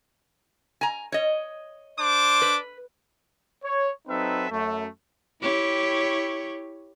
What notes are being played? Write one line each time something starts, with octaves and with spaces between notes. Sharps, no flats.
G#5 A#5
C#5 D#5
D4 C5 D6
B4
C#5
F#3 C4 D#4 A4 B4 E5
F#2 A3
E4 G4 C#5